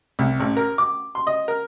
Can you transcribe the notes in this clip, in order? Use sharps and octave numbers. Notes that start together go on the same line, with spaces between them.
C2
A1
A#4
D6
C6
D#5
A#4